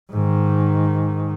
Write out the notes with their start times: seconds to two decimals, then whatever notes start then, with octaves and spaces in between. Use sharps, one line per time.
0.12 G#2 D#3